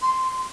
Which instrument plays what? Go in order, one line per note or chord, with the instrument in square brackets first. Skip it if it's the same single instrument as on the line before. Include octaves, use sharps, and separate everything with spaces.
[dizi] C6